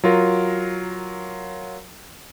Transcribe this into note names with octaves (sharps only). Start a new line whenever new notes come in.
F#3 F4 A#4